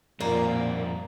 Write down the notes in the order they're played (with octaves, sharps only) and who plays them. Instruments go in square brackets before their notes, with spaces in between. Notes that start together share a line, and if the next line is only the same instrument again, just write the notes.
[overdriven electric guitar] F2 G3 [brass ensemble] A#2 [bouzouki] A#3